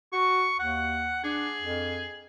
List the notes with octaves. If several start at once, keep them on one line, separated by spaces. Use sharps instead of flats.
F#4 C#6
D#2 F#5
D4 G#4
F2